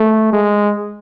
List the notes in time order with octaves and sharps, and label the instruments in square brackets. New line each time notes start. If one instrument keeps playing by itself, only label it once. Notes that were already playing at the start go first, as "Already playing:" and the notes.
Already playing: [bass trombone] A3
G#3